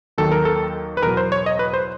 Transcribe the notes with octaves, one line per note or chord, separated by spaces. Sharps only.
D#2 D#3 F#3 A4
A#4
A4
B4
E2 B2 F#3 A#4
C5
C#5
D#5
B4
C5